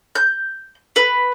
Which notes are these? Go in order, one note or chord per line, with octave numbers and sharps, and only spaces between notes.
G6
B4